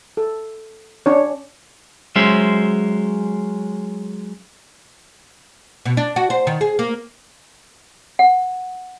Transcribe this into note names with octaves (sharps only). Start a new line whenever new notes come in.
A4
C#4 D4 C#5
F#3 G#3 C#4 C5 E5
B2
D4
F#4
C5
D#3
G#4
A#3
F#5